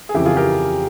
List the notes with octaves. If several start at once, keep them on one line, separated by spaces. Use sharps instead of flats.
G#4
F2 C#3 E3 E4 G4
F4 G#4
G4 A#4